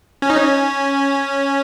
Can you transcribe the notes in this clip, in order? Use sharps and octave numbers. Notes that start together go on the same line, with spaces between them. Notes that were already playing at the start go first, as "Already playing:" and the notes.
C#4
D#4
C#4